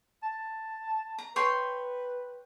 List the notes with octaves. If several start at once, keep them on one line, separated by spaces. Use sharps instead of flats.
A5
A#5
B4 C#5 G5 C6